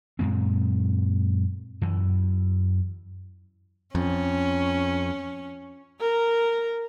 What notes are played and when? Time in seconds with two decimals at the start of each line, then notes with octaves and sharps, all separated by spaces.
0.19 F#2 A#2 G#3 C4
1.81 F#2 E3
3.95 F2 C#4
6.01 A#4 A#5